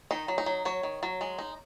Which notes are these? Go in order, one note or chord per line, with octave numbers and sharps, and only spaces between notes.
D#3 D#4
F#3
D#4
F#3
F#3 C#5
D#3
F#3
G#3
D#4